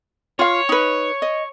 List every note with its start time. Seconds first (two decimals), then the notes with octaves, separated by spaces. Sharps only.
0.39 F4 C#5 F5
0.69 D#4 B4
1.22 D#5